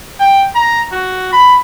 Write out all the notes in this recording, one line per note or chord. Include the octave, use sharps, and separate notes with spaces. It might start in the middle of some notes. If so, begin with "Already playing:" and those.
G5
A#5
F#4
B5